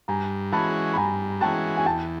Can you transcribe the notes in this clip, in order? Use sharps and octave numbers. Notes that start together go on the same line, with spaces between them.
G2 G#5 A#5
E3 G#3 C#4 F#4 A5 B5
B5
G2 G#5 A#5
E3 G#3 C#4 F#4 G5 A5
G#5
E2 G5 A5